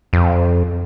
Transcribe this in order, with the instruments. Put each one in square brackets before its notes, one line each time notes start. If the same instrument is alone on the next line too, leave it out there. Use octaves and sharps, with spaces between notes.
[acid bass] F2